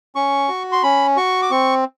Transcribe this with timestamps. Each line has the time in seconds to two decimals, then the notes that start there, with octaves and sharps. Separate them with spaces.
0.15 C#4 C#6
0.49 F#4
0.72 C6
0.83 C#4 B5
1.17 F#4 C#6
1.42 D6
1.51 C4 C#6